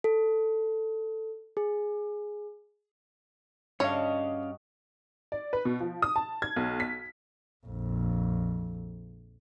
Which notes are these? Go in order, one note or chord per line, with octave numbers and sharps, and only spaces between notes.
A4
G#4
G2 C#4 F#4 G4 C#5 D#5 F5
D5
B4
B2
F3
D#6
A5
G#6
B1
B6
A#1 F2